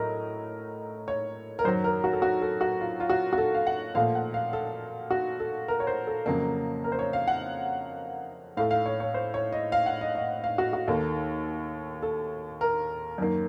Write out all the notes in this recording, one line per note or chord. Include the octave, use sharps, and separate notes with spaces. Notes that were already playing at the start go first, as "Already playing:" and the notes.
Already playing: A2 F#3 A3 A#4 D#5
C#5
A#4
F#2 D#3 F#3 C5
A#4
F#4
A4
F#4
A4
F#4
F4
F4
F#4
F#4
A4
F5
F#5
A#2 F3 A3 F5
F#5
F5
A4
F#4
A4
A#4
C#5
C5
A4
F2 C#3 F#3 A#3
A#4
C5
C#5
F5
F#5
A2 A3 F5
F5
C#5
C#5
C5
C#5
D#5
F5
F#5
D#5
D#5
F5
F#4
F#4
D#2 D#3 A#3 A4
A4
A#4
F#2 D#3 A#3